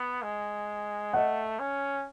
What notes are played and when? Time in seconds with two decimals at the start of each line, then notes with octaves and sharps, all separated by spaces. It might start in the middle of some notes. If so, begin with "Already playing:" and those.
Already playing: B3
0.23 G#3
1.13 A3 D#5 F#5
1.60 C#4